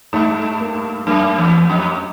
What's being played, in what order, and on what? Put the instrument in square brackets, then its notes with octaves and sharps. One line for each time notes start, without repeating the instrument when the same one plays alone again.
[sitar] G2 [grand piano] A3
[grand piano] A#3
[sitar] F#2 [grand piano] A#3
[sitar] E2
F2